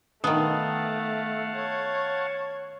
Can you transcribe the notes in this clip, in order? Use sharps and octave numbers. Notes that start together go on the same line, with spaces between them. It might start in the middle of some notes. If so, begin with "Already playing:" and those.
D#3 A3 B3 F5 F#5 A5 D#6
C#5